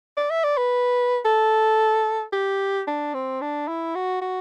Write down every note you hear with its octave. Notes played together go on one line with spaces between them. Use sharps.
D5
E5
D5
B4
A4
G4
D4
C4
D4
E4
F#4
F#4